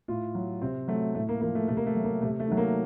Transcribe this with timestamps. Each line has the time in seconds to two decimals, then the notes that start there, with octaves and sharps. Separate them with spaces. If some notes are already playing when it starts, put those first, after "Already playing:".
0.08 A2 F4
0.35 F#3
0.62 C3 C4
0.88 F#3 A3
1.15 A2 A3
1.29 A#3
1.41 F3 A#3
1.55 A3
1.68 C3 A3
1.77 A#3
1.87 A3
1.95 F#3
2.04 A#3
2.21 C3 A3
2.40 A3
2.48 D#3 F#3
2.57 A#3